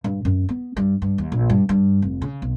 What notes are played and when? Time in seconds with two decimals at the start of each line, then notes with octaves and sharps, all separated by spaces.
0.04 G2
0.25 F#2
0.49 B3
0.77 G2
1.02 G2
1.18 D#2
1.32 A#1
1.50 G2
1.69 G2
2.02 F1
2.22 C#3
2.42 B1